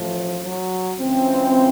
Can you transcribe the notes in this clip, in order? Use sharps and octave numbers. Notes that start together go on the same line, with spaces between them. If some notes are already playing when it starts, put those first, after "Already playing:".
Already playing: A1 A2 E3 F3
F#3
C#2 C#3 E3 C4